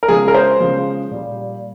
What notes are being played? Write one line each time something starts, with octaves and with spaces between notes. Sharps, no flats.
A#4
C#3 F3 G#3 G#4
A#4
C5
C#3 F3 G#3
A#2 G3